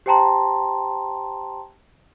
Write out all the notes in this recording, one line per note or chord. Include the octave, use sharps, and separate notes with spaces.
G4 C5 G5 A5 A#5 C6